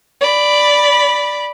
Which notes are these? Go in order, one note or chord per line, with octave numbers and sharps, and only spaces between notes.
D5 B5